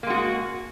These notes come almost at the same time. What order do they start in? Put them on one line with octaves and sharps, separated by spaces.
A#3 G#3 F#4